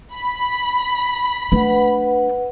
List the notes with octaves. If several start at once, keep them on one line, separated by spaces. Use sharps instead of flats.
B5
A3 D4 B4 F#5